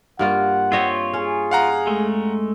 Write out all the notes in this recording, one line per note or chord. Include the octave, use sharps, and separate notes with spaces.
G2 A#3 F4 F#5
C4 F4 C#5 D#5 E5
C#4 G#4
F5 F#5 A#5
G#3 A3